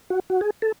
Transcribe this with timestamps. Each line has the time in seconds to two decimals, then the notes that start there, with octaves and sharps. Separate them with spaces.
0.10 F#4
0.30 F#4
0.41 G#4
0.62 A4